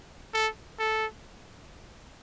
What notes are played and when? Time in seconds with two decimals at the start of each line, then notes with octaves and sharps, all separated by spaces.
0.34 A4
0.79 A4